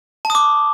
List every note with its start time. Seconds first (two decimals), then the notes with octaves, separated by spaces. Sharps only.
0.25 A5
0.30 D#6
0.35 D6